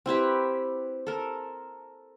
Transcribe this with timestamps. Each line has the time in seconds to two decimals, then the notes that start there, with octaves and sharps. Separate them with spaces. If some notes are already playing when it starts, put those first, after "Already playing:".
0.06 C4 E4 G4 B4
1.07 A4 A#4